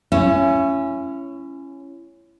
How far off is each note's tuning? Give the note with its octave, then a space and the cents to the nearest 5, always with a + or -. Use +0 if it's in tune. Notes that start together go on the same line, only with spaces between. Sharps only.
C#4 +0 E4 +35